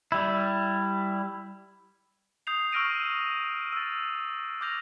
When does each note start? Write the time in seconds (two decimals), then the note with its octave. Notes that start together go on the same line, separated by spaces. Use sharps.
0.12 G3 E4
2.47 D#6 G6 C7 F7
2.72 C#6 E6 F6 A#6 D7 D#7
3.73 E6 A6
4.61 D6 F6 G6 A#6 F7